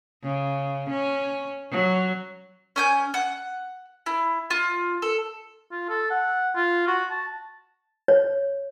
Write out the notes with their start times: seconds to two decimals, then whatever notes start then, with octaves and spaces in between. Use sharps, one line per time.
0.23 C#3
0.90 C#4
1.71 F#3
2.76 C#4 G#5 G6
3.14 F#5
4.06 E4
4.50 F4
5.02 A4
5.72 F4
5.89 A4
6.11 F#5
6.55 F4
6.87 F#4
7.10 A5
8.08 C#5